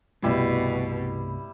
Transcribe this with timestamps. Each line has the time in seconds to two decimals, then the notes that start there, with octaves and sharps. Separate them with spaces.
0.23 C2 G2 B2 G3 A3 E4 G4